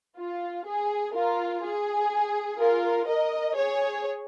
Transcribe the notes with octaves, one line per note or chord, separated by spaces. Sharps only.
F4
G#4
F4 A#4
G#4
F4 A#4
A#4 D#5
G#4 C#5